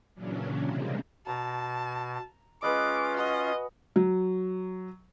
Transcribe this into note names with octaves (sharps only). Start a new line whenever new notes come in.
A#2 C#3 E3 F#3 C#4 D4
C3 G3 G#3 A#3 C4
B2 A5 A#5
G#3 C#4 F4 B4 D#5 D6
F#4 D#5
F#3